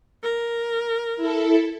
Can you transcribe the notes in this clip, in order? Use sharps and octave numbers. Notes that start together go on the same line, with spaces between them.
A#4
E4 A4